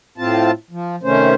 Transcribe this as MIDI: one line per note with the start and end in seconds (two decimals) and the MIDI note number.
0.18 0.51 45
0.18 0.51 60
0.18 0.51 65
0.18 0.51 81
0.71 0.96 53
1.03 1.35 48
1.03 1.35 51
1.03 1.35 57
1.03 1.35 61
1.03 1.35 72